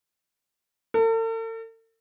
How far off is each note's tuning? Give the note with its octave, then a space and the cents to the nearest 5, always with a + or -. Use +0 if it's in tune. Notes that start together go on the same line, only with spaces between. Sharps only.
A4 +45